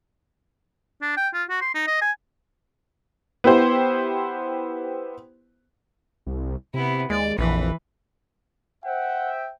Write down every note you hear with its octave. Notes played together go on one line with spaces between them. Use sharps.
D4
G5
F4
F#4
C6
D#4
D#5
G#5
B3 E4 G4 C5
C2
C3 B3 E4
D#2 G#3 D5
A#1 F2 E3 B4
C5 E5 F#5 G5